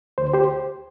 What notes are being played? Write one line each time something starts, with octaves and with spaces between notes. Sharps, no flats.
D2 C5
G4 C5